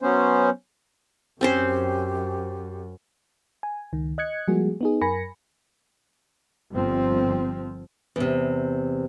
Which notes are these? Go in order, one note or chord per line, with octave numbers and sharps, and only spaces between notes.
F#3 B3 C#4 C5
F#2 C4 C#4 G4 C5
G#5
C#2 D#3
D#5 F#6 G#6 C#7
F3 G3 G#3 A#3 F#4 G#4
B3 D#4 G#4
F#2 A#4 G#5 B5 A#6 C#7
G1 F3 C4
E2 C3